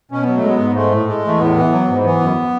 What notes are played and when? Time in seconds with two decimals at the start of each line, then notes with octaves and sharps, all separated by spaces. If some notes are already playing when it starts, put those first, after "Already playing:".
0.11 B2 C#4
0.23 F#3 B3
0.36 A3
0.43 G#3
0.49 B3
0.59 G#2
0.75 G#3 A3
0.91 A2
1.08 G#3
1.24 E2 A3
1.39 A2 B3
1.57 E3
1.72 F#3
1.89 G#2
2.04 E3 B3
2.20 F#2